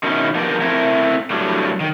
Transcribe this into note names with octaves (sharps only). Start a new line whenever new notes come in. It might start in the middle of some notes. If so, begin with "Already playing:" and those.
B2 D#3 C#4 D#4 E4
F3 A#3 B3 D4 G4 A#4
A3 C4 E4 A#4
A2 F#3 G3 D4
D#3